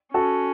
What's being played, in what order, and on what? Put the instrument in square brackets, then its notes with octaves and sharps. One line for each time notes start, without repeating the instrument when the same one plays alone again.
[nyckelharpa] C#4 [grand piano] F#4 A4